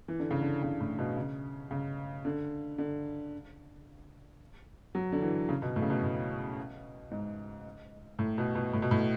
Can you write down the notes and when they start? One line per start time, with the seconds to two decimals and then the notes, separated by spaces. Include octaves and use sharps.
0.08 E3
0.19 D3
0.31 C#3
0.42 D3
0.63 C#3
0.80 A2
0.99 B2
1.17 C#3
1.71 C#3
2.25 D3
2.78 D3
4.95 F#3
5.12 D3
5.22 E3
5.49 C#3
5.62 B2
5.76 A2
5.82 C#3
5.90 B2
6.03 A2
7.11 G#2
8.19 A2
8.38 B2
8.55 B2
8.73 A2
8.82 B2
8.91 A2